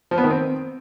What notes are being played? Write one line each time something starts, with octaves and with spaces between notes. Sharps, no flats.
F3
B3
D#3
C4